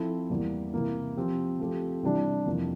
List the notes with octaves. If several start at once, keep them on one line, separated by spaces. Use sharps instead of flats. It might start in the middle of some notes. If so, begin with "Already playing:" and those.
Already playing: F3 C4 E4 A4
E2 E3 G3 A#3
C3 E3 A#3
F3 C4 G4
F3 A3 C4 G4
C3 E3 G3 D4
F2 C3 E3 A#3